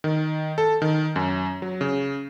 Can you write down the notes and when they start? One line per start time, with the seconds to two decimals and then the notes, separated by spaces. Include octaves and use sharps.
0.04 D#3
0.58 A4
0.82 D#3
1.16 F#2
1.62 F#3
1.81 C#3